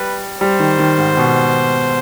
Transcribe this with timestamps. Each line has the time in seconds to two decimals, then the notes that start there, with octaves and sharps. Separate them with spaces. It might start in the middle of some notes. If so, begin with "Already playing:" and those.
Already playing: G3 B4
0.40 G3 C5
0.59 D#3
0.79 D#3
0.98 G#2
1.17 B2